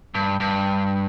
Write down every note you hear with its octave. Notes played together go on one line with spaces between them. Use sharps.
G2
G2